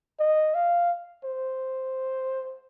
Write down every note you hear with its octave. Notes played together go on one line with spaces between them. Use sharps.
D#5
F5
C5